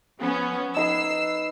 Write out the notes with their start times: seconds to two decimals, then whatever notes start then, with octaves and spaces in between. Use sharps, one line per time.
0.19 F3 B3 C#4
0.77 D#4 B4 F#5 E6 C7